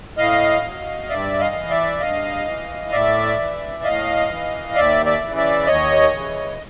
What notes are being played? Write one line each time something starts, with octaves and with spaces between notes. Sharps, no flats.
A2 D#5 F5
F#3
G2 D5 E5
D#5 F5
E3
D5 E5
G2 D#5 F5
E3
A2 D5 E5
E3
A2 D#5 F5
E3
D#2 D5 E5
D5 E5
C#3 E3
D5 E5
D#2 C#5 D#5
C#3 E3